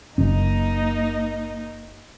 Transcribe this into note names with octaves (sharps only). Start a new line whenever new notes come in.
F#1 A#3 C#4 D#4